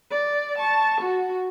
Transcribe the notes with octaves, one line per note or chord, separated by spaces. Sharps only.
D5
A5 C#6
F#4